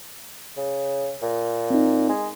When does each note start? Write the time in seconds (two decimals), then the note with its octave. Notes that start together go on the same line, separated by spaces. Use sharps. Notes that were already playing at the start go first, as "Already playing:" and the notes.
0.57 C#3
1.22 A#2
1.70 C4 D#4
2.09 G#3